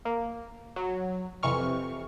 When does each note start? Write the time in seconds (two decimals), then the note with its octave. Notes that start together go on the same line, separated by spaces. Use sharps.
0.05 A#3
0.76 F#3
1.43 F2 C3 E3 C#6 F6